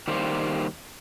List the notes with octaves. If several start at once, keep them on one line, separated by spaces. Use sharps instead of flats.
D#3 G3 A#3 G4 C5